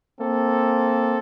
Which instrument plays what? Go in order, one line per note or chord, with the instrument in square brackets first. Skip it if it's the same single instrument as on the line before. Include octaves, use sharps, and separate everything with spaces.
[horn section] A#3 C4 A4